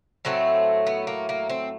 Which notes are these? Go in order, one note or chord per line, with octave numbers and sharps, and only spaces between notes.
A2 F#3 A3 C4
B3
A#3
A#3
C4